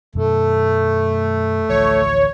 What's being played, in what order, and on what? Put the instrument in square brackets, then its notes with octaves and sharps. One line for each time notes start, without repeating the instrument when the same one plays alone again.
[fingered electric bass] F#2 B2 D#3 [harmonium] A3
[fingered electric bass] A1 D2 F3 [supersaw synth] C#5